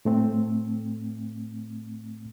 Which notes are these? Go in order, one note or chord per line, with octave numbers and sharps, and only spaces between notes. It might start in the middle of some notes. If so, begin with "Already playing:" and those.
A2 A3 C4